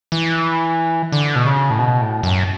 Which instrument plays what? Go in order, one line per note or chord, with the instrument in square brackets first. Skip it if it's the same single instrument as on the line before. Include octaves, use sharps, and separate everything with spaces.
[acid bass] E3
D3
B2
C#3
A2
B2
A2
F#2